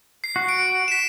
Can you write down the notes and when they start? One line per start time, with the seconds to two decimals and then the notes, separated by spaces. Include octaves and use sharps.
0.24 C7
0.36 F#4
0.49 D7
0.88 B6 E7